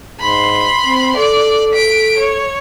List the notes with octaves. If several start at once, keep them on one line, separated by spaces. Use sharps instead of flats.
G#2 B5 C6
C4
A4 D5
B6 D7
C#5